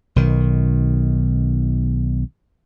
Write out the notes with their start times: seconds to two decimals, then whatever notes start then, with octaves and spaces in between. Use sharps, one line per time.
0.16 B1 D#3